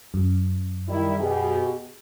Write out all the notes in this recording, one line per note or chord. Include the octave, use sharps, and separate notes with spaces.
F#2
D#3 G3 E4
B2 G4 G#4